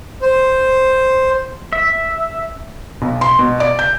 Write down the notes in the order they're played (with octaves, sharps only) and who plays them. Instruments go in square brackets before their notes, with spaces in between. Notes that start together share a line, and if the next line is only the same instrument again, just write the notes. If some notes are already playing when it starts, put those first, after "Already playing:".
[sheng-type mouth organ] C5
[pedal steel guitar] E5
[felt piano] B1
C6
B2
D5
G6